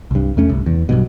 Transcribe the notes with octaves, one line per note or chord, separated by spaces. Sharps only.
C2 G2
E2 A3 C#4
G1 C2
E2
B1 G2 B2